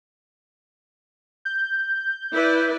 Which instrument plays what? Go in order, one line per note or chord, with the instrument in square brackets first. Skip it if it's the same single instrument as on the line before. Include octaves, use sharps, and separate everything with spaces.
[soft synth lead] G6
[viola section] E4 B4 D5